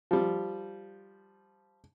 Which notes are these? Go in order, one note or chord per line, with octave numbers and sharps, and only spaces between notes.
F3 G3